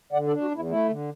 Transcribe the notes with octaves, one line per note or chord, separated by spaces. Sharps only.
D3 D5 F#5
A4 D5
D4
F#4
E2 E4
A3 E4
D3